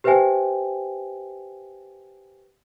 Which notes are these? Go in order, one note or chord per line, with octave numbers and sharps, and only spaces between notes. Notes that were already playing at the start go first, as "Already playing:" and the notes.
G4 B4 C5 E5 G5 G#5